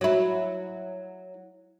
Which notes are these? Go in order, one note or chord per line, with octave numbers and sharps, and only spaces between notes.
F#3 E4